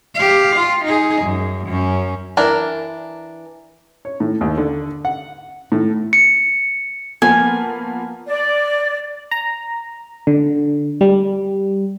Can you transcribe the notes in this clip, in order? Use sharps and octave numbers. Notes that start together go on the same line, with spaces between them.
G4 F5
F4
D#4 G#4
F#2
F#2 C#4
E3 D4 A#4
C#5
A2
D#2
D3
F#5
A2
C#7
F3 A#3 B3 G#5
D5
A#5
D3
G3